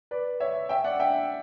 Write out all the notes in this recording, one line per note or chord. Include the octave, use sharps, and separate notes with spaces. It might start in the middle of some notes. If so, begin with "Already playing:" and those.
B4 D5
C#5 E5
E5 G5
D5 F#5
E5 G5